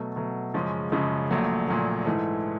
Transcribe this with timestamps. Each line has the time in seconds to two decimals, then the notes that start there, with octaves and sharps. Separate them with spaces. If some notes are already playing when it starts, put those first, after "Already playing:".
Already playing: B2 F#3 A3
0.16 B2 F#3 A3
0.54 F#2 C#3 F3 G#3 C#4
0.92 F#2 C#3 F3 G#3 C#4
1.31 A#1 A#2 F#3 A3
1.68 A#1 A#2 F#3 A3
2.06 G#2 E3 A3